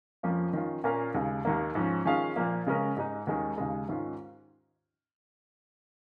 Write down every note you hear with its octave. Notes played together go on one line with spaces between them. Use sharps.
F2 F3 A#3 C#4 F4
D#3 C#4 F4
A#2 A#3 C#4 A#4 F5
D#2 C#3 G#3
D#2 D#3 A#3
G#2 F3 C#4
D#3 C#4 F4 G#4 F5
A#2 F3 A#3
C#3 G#3 C#4 A#4
G#2 G#3 D#4
D#2 D#3 G#3 C#4
D#2 C#3 G#3
G#2 D#3 C#4 F4